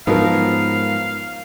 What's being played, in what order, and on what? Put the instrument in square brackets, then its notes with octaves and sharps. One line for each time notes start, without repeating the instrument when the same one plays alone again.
[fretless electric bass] G#2 [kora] F3 F#3 D#4 [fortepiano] B3 A#4 [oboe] F5